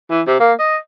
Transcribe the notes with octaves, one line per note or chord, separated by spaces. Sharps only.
E3
C3
A#3
D#5